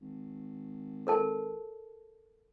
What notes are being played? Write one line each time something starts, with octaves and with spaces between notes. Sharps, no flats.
G#1
A4 A#4 A5